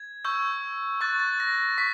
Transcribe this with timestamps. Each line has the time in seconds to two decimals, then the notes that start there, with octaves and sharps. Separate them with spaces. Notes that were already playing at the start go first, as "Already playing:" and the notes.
Already playing: G#6
0.25 C#6 E6 G6
1.01 C#6 F#6 A6
1.20 A6
1.40 A#6
1.78 C#6 B6